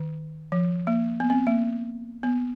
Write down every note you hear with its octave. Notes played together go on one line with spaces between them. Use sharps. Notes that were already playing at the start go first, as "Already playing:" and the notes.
Already playing: D#3
F3
A#3
B3
C4
A#3
B3